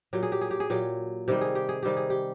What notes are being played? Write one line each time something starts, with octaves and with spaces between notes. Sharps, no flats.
A#2 F#3 G4
G#4
G4
G#4
G4
G#4
A#2 F#3 G4
C3 D#3 G3 G4
G#4
G4
G#4
C3 D#3 G3 G4
G#4
G4